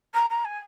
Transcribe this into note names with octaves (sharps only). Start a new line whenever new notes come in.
A#5
A#5
G#5